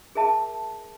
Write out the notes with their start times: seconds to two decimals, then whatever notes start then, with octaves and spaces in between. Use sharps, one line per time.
0.15 G#4 A#4 E5 A5